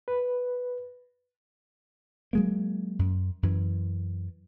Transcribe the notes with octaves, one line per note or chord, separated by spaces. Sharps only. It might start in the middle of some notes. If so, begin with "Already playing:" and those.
B4
F#3 G#3 A#3
F#2
F#2 E3